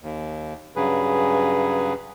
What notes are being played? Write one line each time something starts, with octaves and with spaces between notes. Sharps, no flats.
D#2
G2 C#3 F#3 G#4 B4